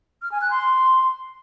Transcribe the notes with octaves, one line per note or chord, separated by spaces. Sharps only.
F6
G#5
F#6
C6